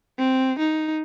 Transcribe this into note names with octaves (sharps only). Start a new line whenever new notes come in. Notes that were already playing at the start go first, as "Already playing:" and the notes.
C4
D#4